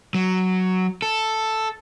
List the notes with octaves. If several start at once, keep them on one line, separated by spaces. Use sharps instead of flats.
F#3
A4